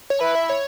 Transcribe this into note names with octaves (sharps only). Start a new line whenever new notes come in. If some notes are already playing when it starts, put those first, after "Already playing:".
C#5
E4 B4
E5
C#5